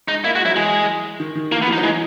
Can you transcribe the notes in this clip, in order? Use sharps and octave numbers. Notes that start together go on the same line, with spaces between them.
G#3 D#4
A#3 E4
G#3 F#4
F#3 E4
E3 G#3
D#3
D#3
E3 A#3
B3
E3
D#4
F#3
E3 G#3